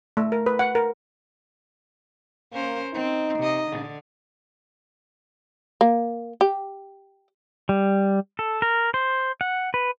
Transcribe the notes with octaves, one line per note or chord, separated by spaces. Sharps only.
A3
A#4
B4
F#5
A#4
A#3 C#4 A#4 C5
C4 D#4
C3 D#5
D3
A#3
G4
G3
A4
A#4
C5
F#5
B4